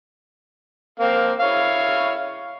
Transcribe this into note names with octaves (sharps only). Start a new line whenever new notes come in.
A#3 C4 F5
E4 C#5 F5